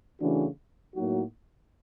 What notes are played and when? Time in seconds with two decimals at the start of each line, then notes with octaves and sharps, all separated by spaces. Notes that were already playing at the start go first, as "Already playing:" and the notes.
0.20 C#3 E3 A3 D4 F#4
0.95 A2 F#3 A#3 D#4 F#4